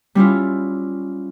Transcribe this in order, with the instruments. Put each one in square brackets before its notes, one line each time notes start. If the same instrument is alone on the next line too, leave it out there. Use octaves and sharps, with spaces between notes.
[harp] G3 C#4 E4 F4